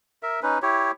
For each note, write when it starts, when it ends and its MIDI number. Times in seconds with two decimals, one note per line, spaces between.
0.23 0.40 70
0.23 0.40 76
0.43 0.59 61
0.43 0.59 63
0.43 0.59 71
0.62 0.91 64
0.62 0.91 67
0.62 0.91 73